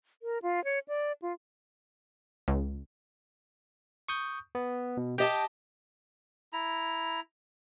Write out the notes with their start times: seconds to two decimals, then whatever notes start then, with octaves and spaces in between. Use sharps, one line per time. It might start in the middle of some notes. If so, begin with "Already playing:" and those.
0.22 A#4
0.42 F4
0.64 C#5
0.88 D5
1.22 F4
2.48 C#2
4.08 C#6 D#6 G6
4.55 B3
4.97 B2
5.18 G4 D#5 G5 A5
6.53 E4 A#5